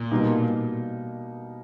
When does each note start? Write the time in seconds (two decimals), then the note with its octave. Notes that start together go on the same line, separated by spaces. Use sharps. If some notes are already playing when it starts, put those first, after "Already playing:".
Already playing: A#2
0.11 B2 G3 A#3 D#4